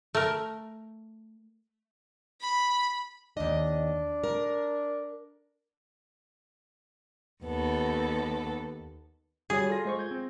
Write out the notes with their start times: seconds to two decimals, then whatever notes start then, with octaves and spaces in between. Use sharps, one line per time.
0.15 A3 A#4
2.41 B5
3.37 D#2 D4 D#5
4.24 A#4
7.44 D#2 B3 A4
9.50 G3 F#4 G#4 C#5
9.70 F4 A4 A#6
9.85 G#3 C5 C#6
9.99 G6 G#6
10.11 C4